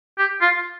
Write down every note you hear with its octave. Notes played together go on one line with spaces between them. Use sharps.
G4
F4